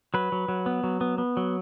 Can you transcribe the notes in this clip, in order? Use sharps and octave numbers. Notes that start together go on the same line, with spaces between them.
F#3 B4
F#3
F#3
B3
F#3
B3
B3
F#3